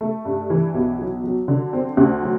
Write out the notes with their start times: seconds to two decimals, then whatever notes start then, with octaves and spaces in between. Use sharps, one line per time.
0.01 A3
0.25 G2
0.50 E3
0.74 B1
0.99 F#3
1.24 F#3
1.48 D3
1.73 C4
1.97 D2
2.23 F#3